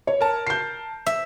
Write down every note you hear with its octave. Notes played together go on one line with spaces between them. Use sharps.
C#5
A#4 A5
G6 C7
E5